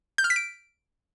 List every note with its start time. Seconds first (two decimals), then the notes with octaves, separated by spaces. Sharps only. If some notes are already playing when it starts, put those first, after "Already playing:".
0.18 G6
0.24 F6
0.30 B6
0.36 D7